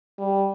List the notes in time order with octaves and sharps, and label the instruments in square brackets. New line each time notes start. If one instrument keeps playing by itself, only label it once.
[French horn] G3